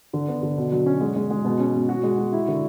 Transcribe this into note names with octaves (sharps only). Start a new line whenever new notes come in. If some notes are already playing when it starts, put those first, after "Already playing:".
D3
B3
D3
B2
F#3
C#4
G#3
G#3
G#3
B2
C#4
B2
F#4
G#3
F#4
E4
D3